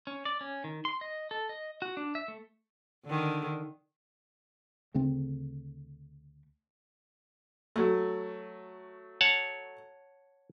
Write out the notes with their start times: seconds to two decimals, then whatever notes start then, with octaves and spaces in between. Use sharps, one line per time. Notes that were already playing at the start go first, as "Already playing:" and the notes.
0.07 C#4
0.25 D5
0.41 C#4
0.64 D#3
0.85 C6
1.01 D#5
1.31 A4
1.49 D#5
1.82 F#4
1.97 D4
2.15 E5
2.28 A3
3.05 D3 D#3
4.94 D2 C#3 A3 C4
7.76 F#3 A3
9.21 C#5 F#5 A5